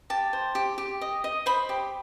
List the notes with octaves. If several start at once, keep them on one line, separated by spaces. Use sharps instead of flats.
G4 A5
C5
G4
G4
D#5
D#5
C5 B5
G4